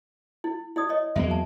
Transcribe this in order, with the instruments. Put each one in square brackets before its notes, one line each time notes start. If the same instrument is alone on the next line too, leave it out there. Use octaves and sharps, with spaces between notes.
[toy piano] E4
E4 D5 D#6
C#5 D#5
[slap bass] E2 F#3 A#3 [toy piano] E5
[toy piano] A5